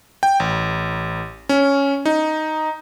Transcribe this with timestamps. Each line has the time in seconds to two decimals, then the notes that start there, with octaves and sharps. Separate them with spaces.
0.23 G5
0.40 A1
1.49 C#4
2.06 D#4